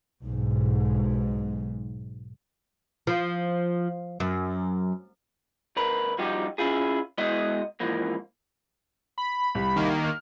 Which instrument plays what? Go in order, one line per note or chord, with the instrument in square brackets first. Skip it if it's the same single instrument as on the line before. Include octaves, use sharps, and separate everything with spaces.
[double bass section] B1 G#2
[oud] F3
F#2
[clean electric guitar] D2 A#4 B4
G2 F3 D#4 F#4 G4
C#4 E4 F4 G#4
G#3 B3 E4 F#4 D#5
G#2 E3 F3 A#3
[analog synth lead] B5
[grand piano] C2
[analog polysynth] D#3 A#3
[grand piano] F6